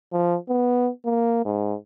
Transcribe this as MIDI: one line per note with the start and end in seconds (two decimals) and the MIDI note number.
0.13 0.36 53
0.49 0.90 59
1.05 1.41 58
1.45 1.75 44